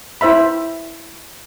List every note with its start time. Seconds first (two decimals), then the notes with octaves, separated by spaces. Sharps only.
0.21 E4 C5 E5 B5